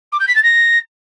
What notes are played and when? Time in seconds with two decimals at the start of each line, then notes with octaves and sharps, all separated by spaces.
0.12 D6
0.20 G6
0.27 B6
0.35 A6
0.43 A#6